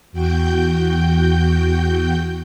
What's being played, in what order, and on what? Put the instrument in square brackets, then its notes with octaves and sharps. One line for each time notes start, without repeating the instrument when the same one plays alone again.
[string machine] E2 F#4 G5 G6